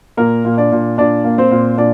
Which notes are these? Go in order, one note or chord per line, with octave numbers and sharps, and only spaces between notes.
A#2 A#3 A#4
A#2
D4 D5
A#2
A#2 D4 D5
A#3
C4 C5
A#2
A#2 D4 D5